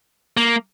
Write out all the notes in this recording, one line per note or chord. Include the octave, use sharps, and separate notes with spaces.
A#3